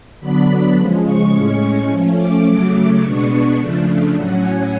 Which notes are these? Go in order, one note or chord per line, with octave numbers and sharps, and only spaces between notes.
D3 F#3 B3 D4 B5
C#3 F3 G#3
C#6
A2 G#3 C#4
F3 A3 C#4
D6
C#3 F#3 A3
B2 G#3 B3 D4 C#6
C#6
C#3 F3 A3 D4
A2 F#3 C#4 F#5
G#5